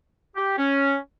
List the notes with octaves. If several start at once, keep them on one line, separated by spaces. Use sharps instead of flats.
G4
C#4